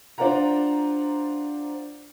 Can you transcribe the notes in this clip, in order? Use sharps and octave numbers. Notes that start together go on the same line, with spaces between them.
D4 F4 C5 D5 F#5 A#5